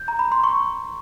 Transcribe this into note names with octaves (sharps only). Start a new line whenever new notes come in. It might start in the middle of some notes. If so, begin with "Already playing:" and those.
Already playing: G6
A#5
B5
C6
C#6